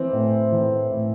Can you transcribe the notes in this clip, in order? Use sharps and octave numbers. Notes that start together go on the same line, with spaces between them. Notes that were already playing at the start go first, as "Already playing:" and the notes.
Already playing: E3 C4
A2
E3
A2